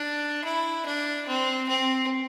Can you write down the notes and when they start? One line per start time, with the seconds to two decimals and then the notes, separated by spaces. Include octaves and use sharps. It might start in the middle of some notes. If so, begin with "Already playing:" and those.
Already playing: D4
0.44 E4
0.86 D4
1.27 C4
1.69 C4